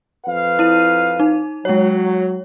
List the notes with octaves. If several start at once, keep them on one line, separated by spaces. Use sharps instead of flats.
F2 B4 F5
E4 D#7
D#4
F#3 G#3 C#5